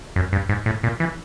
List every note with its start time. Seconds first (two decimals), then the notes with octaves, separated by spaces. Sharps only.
0.16 F#2
0.33 G2
0.49 G#2
0.66 A2
0.83 A#2
1.00 E3